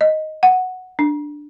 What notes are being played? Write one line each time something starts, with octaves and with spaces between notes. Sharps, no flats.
D#5
F#5
D4